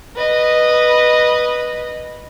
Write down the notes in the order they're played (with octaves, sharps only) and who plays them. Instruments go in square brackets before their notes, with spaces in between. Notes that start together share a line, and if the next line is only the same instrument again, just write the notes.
[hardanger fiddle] B4 D#5